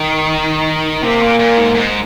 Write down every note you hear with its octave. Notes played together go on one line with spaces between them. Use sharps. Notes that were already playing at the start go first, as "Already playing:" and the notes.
Already playing: D#3
C3 A#3
A#2
A#2
G#2
G#2